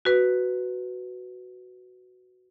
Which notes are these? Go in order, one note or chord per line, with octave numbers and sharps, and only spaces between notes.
F#4 B4